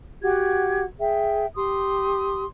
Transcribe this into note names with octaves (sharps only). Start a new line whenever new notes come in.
F#4 G4 F#5 G#6
G#4 E5 G5
G4 C6 D#6